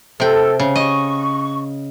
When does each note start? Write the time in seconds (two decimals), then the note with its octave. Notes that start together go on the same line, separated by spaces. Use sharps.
0.20 C3 A4 G5
0.60 C#3
0.76 D#5 C#6